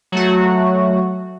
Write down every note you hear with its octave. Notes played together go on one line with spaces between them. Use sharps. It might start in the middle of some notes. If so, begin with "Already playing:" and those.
F#3 A3 F#4